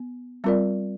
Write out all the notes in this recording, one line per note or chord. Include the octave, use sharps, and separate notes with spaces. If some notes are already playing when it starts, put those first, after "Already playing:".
Already playing: B3
G3 C4 F4 A#4 D5